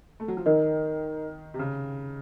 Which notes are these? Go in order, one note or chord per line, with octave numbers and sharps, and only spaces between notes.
A3
F#3
F3
D#3 D#4 A#4 D#5
C3
C#3